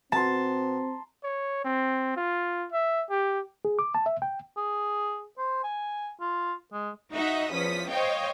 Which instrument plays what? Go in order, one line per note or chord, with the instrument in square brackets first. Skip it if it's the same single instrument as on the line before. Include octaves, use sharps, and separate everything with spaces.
[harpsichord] B2 [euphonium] C4 [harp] A5 [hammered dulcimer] A#5 C6
[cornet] C#5
C4
F4
E5
G4
[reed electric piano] G#4
D6
A5
E5
G5
[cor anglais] G#4
C5
G#5
F4
G#3
[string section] D#4 F#4 D#5 E5 F#5
E2 F3 C#4 D#6 B6
C5 C#5 D#5 F5 G5